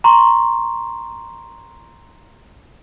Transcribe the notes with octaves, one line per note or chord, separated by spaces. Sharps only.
A#5 C6 C#6